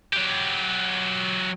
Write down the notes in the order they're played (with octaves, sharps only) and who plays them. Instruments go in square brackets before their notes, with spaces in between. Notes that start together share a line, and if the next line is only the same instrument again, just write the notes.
[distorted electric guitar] F#3 G4